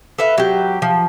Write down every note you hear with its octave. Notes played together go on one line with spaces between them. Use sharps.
A4 B4 E5 F5
F#3 G4
F3